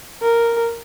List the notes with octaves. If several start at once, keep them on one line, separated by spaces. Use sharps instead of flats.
A#4